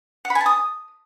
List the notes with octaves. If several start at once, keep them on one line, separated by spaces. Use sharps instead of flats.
F#5
B5
G#5
A5
D#6